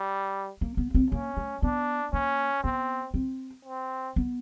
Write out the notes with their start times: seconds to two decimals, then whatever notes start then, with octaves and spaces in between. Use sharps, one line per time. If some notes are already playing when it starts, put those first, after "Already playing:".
Already playing: G3
0.61 A#3
0.77 B3
0.94 C4
1.12 A#3 C#4
1.37 A3
1.62 B3 D4
2.13 A#3 C#4
2.64 B3 C4
3.14 C4
3.65 C4
4.16 B3